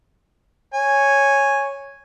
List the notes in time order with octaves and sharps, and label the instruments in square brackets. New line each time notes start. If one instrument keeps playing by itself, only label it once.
[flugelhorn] C#5 [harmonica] G#5